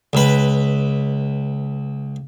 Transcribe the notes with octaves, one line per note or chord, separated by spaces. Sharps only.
C#2 B4